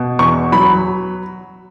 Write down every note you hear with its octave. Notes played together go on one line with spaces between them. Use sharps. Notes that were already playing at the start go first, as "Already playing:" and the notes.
Already playing: B2
E2 C#6
F#3 B5